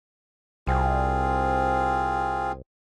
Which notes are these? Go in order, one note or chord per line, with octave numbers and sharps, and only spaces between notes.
C2 C4 F4 G#4